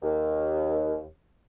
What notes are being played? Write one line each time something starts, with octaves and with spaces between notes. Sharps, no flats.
D#2